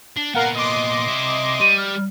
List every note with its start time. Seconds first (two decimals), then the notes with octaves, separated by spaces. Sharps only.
0.17 D4
0.35 A#2 B3 A#4 F5 F#5
0.55 D#5 C6 D6
1.08 C3 E4
1.60 G3 D#7
1.78 F6